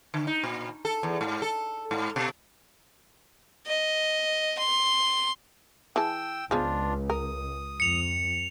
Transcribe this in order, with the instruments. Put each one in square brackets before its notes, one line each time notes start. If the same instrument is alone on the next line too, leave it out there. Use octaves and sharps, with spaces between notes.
[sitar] D3
D#4
A#2
A4
E2
G#2
A4
G#2
B2
[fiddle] D#5
C6
[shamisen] E3 G#4 A5 [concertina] G5 E6
[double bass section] C#2 [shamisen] F3 G#3 B3 [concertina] D4 F4
[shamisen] A#4 [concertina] D#6
[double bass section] F2 [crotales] C#7 F7